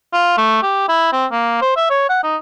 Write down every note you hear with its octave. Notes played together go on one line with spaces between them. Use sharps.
F4
A3
G4
E4
C4
A#3
C5
E5
C#5
F#5
D#4